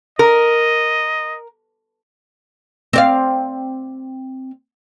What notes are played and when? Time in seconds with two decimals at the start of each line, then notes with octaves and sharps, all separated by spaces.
0.19 A#4 D#5
2.93 C4 D5 F5